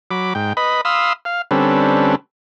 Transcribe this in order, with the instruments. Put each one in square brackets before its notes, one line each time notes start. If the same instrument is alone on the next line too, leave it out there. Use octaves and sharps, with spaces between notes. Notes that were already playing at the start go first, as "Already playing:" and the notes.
[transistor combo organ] F#3 B5 D6
G#2 G5
B4 D#5 B5
F5 B5 C6 D#6 E6
F5
D3 G3 C4 C#4 A4 B4